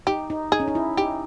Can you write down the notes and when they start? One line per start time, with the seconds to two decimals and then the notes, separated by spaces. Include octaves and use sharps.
0.07 D#4 G4
0.30 D#4
0.52 D#4 G#4
0.60 C#4
0.68 D#4
0.75 E4
0.97 D#4 G4